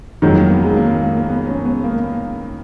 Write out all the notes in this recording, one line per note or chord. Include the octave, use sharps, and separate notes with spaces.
F2 D#3 F#3 G#3
A#3
B3
G#3
A#3
A#3
A#3
A#3
B3
C#4
B3
A#3